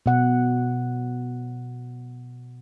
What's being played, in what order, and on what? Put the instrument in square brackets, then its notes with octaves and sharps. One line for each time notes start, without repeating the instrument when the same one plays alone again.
[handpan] B2 F#5